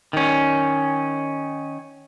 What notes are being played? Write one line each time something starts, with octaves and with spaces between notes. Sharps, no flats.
D#3 C#4